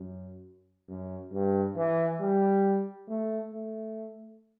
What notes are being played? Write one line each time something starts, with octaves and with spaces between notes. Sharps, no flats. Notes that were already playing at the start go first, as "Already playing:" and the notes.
Already playing: F#2
F#2
G2
E3
G3
A3
A3